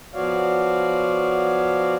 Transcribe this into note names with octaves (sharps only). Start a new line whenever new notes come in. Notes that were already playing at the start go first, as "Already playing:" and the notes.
F3 B3 F#4 C#5 D5 F5